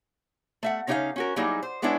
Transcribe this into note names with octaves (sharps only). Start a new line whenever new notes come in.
A3 E5 F#5
C#3 C#4 D#4 G4 E5 F5
C#4 F#4 A#4
F#3 G3 A#3 D#4 E4 G#4
C5
G#3 B3 C#4 D4 E4